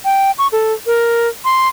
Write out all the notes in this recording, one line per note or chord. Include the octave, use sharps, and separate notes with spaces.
G5
C#6
A4
A#4
C6